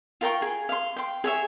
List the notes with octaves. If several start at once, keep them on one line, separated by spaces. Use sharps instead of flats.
F4 A#4 G5 C#6
G#4
F5 C6
G5 C6
G#4 C#5 E5